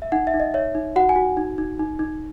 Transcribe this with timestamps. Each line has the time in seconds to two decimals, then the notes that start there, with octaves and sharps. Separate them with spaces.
0.02 E5
0.12 D#4 F#5
0.27 E5
0.34 D#4
0.40 D#5
0.54 C#5 E5
0.75 D#4
0.96 F#4 F#5
1.09 G#5
1.16 F#4
1.37 D#4
1.58 D#4
1.79 D#4
1.99 D#4